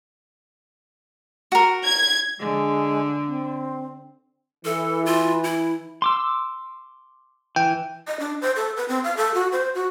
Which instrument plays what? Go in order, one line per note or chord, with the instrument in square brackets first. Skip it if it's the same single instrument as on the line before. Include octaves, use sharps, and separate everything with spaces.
[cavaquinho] F#4 A#4
[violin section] G#6
[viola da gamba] D3 [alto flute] G#3
[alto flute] C4
[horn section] E3 [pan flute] A4
[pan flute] F4
E4
[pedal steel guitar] C6 D6 E6
[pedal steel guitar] E3 [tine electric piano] G5
[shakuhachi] D#5
D4
C5
A4
B4
C4
F5
A4
F#4
C5
F#4